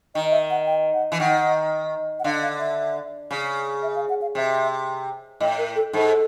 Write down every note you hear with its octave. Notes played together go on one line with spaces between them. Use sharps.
D#3 D#5
E5
F#5
G5
F#5
E3
D#3 F#5
F#5
D3 F5
F5
E5
C#3
E5
F5
F#5
F5
C3 E5
A2 D#5
A#4
A4
G#2 A4